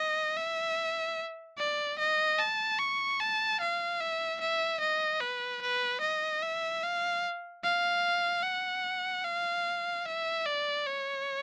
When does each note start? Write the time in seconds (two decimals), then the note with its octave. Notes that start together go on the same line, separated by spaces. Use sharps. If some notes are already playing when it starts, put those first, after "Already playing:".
Already playing: D#5
0.37 E5
1.58 D5
1.99 D#5
2.39 A5
2.78 C#6
3.20 A5
3.60 F5
4.01 E5
4.41 E5
4.80 D#5
5.20 B4
5.62 B4
6.01 D#5
6.43 E5
6.83 F5
7.64 F5
8.43 F#5
9.24 F5
10.05 E5
10.46 D5
10.86 C#5